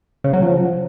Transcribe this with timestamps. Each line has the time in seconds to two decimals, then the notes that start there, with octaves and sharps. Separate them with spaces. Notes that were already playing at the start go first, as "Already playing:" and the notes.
0.24 C#3
0.33 F#3
0.42 F3